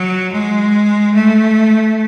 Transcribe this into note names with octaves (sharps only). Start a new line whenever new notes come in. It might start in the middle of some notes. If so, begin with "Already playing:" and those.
Already playing: F#3
G#3
A3